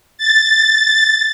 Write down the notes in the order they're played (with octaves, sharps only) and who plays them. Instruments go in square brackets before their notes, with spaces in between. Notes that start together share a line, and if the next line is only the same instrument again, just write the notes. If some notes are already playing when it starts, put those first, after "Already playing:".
[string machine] A6